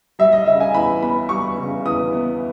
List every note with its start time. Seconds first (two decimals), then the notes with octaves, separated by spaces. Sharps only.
0.19 G3 E5
0.32 D#5
0.46 C#3 E5
0.60 G#5
0.74 E2 B5
1.01 B3 B5
1.29 G3 C#6
1.58 C#3
1.85 E2 D#6
2.13 B3